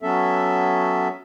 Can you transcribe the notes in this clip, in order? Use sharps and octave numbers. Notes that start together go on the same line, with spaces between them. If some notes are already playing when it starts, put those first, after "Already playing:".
F#3 B3 C#4 A4 E5